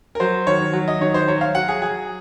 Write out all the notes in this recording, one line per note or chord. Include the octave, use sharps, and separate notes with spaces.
A#4
F#3 C5
D#3 C#5
F#3
D#5
D#3 C#5
C5
F#3 C#5
F5
F#3 F#5
G#4
F#3 G#4